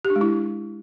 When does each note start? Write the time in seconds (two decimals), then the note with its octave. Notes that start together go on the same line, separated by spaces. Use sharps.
0.05 G4
0.10 D4
0.16 G#3
0.21 E4